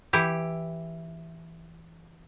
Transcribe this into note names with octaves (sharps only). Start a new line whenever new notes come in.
E3 E4 G4